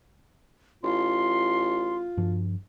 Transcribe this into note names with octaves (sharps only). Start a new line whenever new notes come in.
A1 F4 C6
G2 F3